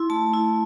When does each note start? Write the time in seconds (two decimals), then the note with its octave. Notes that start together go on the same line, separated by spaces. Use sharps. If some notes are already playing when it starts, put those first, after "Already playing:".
Already playing: E4 C6
0.10 A3 A5
0.34 E4